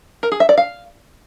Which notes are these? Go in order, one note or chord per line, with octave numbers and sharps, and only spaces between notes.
A#4
G#4
E5
D5
F5